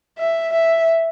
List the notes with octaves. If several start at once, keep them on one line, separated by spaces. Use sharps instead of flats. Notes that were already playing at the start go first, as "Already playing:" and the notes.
E5
E5